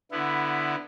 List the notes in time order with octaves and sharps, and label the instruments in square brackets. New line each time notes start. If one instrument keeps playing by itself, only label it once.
[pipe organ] D3 B3 E4